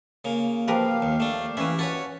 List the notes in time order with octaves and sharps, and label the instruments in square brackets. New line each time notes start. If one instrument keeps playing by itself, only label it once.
[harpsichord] C#3 A#3
[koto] F3 A#4 B4 [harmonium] G4 F5
[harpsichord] D#2
A3 D4
[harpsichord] E3 E4 [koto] C#4 B4
[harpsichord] F#4 B4 C#5 [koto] A5